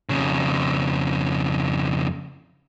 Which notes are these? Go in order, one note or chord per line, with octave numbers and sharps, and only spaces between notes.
F2 C#3